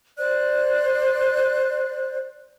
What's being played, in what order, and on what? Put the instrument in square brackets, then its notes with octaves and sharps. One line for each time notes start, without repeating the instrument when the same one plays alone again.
[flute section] C5 D5 F#6